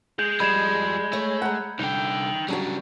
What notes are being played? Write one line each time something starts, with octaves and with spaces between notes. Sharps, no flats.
G#3 G6
F3 G3 D#5 B5 G#6 E7
A3 C#5
F#5 A#5
C2 D3 D#4 G5
C#3 F#3 G3 D4 F#4